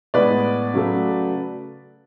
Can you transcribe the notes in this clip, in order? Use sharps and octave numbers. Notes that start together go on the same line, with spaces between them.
A2 G#3 B3 B4 D5
C#3 F#3 A3